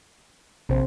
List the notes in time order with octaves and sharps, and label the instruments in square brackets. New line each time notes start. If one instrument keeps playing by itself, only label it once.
[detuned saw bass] A#1 [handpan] C3 C5